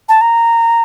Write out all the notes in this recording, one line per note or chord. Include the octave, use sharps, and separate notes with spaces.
A5
A#5